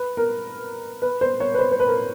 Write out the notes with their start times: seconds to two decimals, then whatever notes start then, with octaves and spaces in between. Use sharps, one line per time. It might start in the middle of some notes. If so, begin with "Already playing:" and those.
Already playing: B4
0.17 A#4
1.02 B4
1.21 C5
1.40 C#5
1.54 B4
1.59 C5
1.72 C5
1.79 B4
1.87 A#4